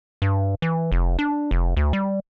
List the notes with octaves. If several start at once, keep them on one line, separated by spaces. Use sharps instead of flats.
G2
E3
F1
D4
F1
D2
G3